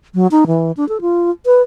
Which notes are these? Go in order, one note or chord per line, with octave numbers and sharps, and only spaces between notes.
F#3
D#4
E3
D4
A4
F4
B4